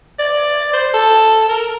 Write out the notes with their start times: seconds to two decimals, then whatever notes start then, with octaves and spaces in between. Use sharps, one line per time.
0.19 D5
0.74 C5
0.94 A4
1.49 A#4